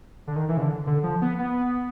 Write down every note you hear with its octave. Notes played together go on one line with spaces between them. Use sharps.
D3
D#3
E3
C#3
D3
D3
F3
B3
B3